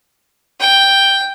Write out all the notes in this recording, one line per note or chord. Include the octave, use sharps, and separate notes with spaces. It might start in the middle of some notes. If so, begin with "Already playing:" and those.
G5